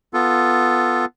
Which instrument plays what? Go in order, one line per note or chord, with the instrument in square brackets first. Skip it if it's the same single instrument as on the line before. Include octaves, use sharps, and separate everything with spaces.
[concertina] B3 F4 A4